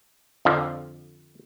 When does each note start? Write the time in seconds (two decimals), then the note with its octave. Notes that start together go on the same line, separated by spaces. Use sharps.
0.45 F2 D3 F3